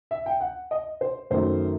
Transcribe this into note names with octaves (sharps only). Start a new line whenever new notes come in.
E5
G5
F#5
D#5
C5
F#2 D#3 F#3 A3 C5